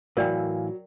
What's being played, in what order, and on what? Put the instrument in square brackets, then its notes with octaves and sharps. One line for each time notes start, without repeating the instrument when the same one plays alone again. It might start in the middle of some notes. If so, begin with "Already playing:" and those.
[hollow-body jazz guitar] A2 E3 [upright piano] F#3 [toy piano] A#4 D5 G5 [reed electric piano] F5 G#5